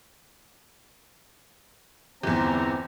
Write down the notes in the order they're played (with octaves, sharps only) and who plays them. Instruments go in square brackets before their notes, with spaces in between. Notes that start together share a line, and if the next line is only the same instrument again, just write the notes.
[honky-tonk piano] G1 E2 [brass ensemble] C4 E4 A#5